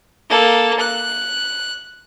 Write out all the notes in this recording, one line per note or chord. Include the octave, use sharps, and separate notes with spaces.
A#3 A4
F#6